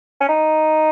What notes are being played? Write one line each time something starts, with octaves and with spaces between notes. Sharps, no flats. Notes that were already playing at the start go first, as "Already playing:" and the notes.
C#4
D#4